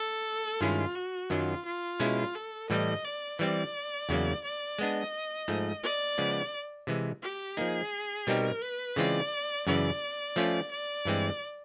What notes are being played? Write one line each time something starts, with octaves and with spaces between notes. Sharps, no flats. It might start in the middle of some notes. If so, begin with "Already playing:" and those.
Already playing: A4
G2 D#3 G#3 C#4 E4 F4
F#4
F#2 D#3 F#3 F4
F4
B2 G#3 C#4 E4
A4
A2 E3 G3 D#5
D5
E3 G3 C4 D5
E2 C#3 F#3 A#3
D5
G#3 B3 D4 D#5
G#2 F3 A3
D5
C#3 F3 G#3 B3
C3 E3 G#3
G4
F3 A#3 D#4 G#4
B2 G3 C4 D#4 G4 A#4
B4
C#3 E3 G#3 C4 F4 D5
F#2 C#3 E3 D5
F3 A3 C#4 F4
D5
G2 E3 G#3 C4